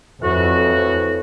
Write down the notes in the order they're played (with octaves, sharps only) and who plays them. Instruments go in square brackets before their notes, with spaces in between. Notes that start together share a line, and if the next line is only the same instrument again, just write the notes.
[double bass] F2 [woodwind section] A2 E3 F#4